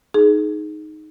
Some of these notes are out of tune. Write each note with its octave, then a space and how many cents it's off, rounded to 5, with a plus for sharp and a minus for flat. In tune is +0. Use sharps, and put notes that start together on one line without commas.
D#4 +0 G#4 +20